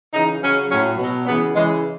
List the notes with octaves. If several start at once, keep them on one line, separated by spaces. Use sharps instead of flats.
C#3 E3 D#4
C#3 F#3 C#4
A2 F#3 C#4
B2 F#3
C#3 E3 B3
C#3 E3 G#3